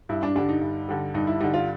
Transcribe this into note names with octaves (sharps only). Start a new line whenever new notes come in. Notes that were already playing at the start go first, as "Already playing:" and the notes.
G2 E4
D4
D3 G3 D4
D#4
G2
D3 G3
G2 D#4
E4
D3 G3 D#4
F4